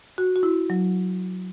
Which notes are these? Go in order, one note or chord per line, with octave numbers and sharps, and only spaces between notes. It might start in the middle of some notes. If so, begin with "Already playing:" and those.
F#4
F#4
E4
F#3